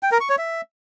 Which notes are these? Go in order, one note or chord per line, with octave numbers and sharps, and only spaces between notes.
G5
A#4
C#6
C#5
E5